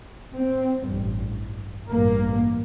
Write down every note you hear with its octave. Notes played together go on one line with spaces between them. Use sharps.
C4
A1 G2
A1 G2 A#3